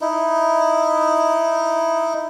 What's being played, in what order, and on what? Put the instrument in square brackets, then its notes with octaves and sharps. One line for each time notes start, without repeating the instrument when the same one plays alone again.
[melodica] D#4 E4